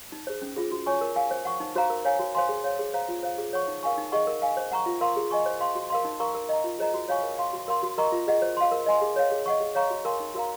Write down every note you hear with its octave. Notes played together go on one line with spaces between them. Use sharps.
D#4
G#4 C5
C#4
F4 G#4
F#4
C#5 G#5 C#6
A#4
F5 G#5
C5
F#5 C#6
D#4
F#4 C5 F5 A#5
A#4
C#5 F5 G#5
F#4
C5 F5 G#5 C6
G#4
C#5 F5
G#4
C5 F5 A#5
F4
C5 F5
G#4
C#5 F#5 C#6
D#4
A#4 F5 G#5 C#6
D#4
G#4 D#5 F#5 C#6
A#4
F5 G#5
C5
F#5 A#5 C#6
F4
A#4 F5 C6
G#4
D#5 G#5 C#6
C5
F5 C6
F#4
A#4 F5 C6
D#4
A#4 F5 A#5 C#6
A#4
D#5 A#5
F4
G#4 C5 D#5 A#5
F#4
C#5 F5 G#5 C#6
A#4
F5 C6
F#4
A#4 F5 C6
F#4
A#4 D#5 A#5 C#6
F4
G#4 D#5 F#5
C5
F5 C6
A#4
D#5 G#5 C6
G#4
C#5 F5
G#4
D#5 F#5 C#6
G#4
C#5 F5 A#5 C#6
F#4
A#4 F5 G#5 C6
D#4
F#4 A#4 F5 A#5